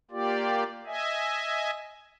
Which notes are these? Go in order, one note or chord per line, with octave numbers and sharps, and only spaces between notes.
A#3 F4 G4 D5
D#5 E5 G#5